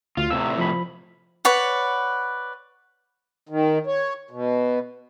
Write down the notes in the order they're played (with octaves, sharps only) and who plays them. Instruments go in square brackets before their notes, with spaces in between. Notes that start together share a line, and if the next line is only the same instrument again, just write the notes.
[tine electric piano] D2 [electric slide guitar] F4
[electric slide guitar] A2 C3 [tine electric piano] E6
[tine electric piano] F3 B5
[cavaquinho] B4 C#5 D5 F#5
[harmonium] D#3
C#5
B2